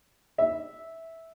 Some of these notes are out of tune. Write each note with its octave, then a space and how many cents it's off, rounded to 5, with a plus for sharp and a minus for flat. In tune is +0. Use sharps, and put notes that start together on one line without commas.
E5 -10